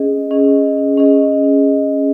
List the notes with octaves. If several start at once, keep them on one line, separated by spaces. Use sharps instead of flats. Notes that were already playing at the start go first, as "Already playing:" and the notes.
Already playing: C#4 G#4 D#5
C#4 G#4 D#5
C#4 G#4 D#5